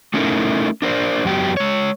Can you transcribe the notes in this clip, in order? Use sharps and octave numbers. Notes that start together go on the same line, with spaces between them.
A3 C#4 D#4 E4 A4 A#4
D4 A#4 C5 D5
F#2 F#3 B3 G4
G#3 C#5